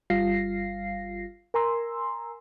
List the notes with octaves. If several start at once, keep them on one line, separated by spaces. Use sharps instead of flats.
G1 G3 F4 F5 A#6 C7
A#4 G#5 A#5 C6 E6